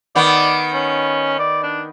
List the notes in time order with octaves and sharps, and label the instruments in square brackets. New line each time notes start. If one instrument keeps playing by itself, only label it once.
[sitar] D#3 B3 [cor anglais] D5
[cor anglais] C#4
D5
D4